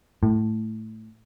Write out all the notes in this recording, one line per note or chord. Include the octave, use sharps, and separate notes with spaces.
A2